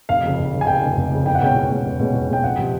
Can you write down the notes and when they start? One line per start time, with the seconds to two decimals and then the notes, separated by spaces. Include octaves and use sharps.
0.09 F1 F5
0.23 F2 C#3
0.39 F1
0.53 F2 C#3
0.61 G#5
0.67 F1 G5
0.83 F2 C#3
0.97 F1
1.11 F2 C#3
1.26 E2 G5
1.35 F#5
1.40 B2 G#3 C#4 G5
1.56 E2
1.70 B2 G#3 C#4
1.85 E2
1.99 B2 G#3 C#4
2.14 E2
2.28 B2 G#3 C#4 G5
2.43 F2 F#5
2.58 C3 F3